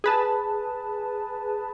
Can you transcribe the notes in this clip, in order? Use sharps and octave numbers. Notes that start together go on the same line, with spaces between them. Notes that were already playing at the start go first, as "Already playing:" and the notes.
G#4 B4 A5